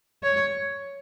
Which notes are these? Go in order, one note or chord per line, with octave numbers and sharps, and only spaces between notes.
C#5